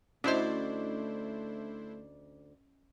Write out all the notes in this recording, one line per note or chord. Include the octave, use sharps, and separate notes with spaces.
D2 A3 C#4 D4 E4 C5 D5 D#5